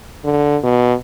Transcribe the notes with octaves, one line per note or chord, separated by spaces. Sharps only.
D3
B2